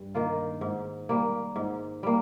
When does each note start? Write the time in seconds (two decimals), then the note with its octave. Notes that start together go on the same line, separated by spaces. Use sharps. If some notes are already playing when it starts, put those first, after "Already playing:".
Already playing: G2
0.15 D#3 A#3 F4
0.61 G#2
1.09 G3 A#3
1.56 G#2
2.03 G3 A#3